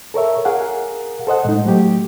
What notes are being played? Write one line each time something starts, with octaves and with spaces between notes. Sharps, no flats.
A4 A#4 C#5 E5
G#4 A#4 F5 F#5
A4 C5 D#5 F#5
A2 G#3 D#4
F#3 A3 G4